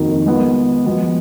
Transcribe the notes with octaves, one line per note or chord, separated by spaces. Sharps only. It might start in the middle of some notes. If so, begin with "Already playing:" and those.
Already playing: F2 D#3 A#3 D#4 F#4
G#3 B3 F4
F3 G#3 B3 F#4